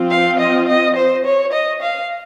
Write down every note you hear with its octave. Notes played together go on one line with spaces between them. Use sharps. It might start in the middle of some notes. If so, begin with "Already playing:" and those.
Already playing: F3 C4 F4
F5
D#5
D#5
C5
C#5
D#5
F5